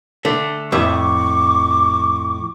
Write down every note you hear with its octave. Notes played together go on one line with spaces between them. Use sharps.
D3 A3
F2 A2 E5 C#6 D6